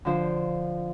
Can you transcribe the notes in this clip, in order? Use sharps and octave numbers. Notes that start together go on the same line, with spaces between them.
D3 F3 C5